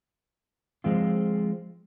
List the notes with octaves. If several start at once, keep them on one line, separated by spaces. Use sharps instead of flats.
F3 G#3 C4 F4 C5